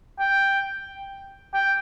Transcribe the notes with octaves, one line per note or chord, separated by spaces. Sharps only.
G5
G5